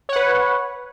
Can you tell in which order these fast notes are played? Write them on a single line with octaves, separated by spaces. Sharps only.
C#5 F#5 B4